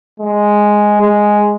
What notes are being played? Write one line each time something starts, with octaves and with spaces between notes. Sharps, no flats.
G#3
G#3